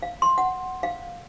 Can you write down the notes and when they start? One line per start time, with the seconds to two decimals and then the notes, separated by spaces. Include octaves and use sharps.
0.02 F5
0.22 C6
0.38 F#5
0.83 F5